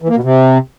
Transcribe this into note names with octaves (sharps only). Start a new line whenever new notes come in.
E3
A#3
B2
C3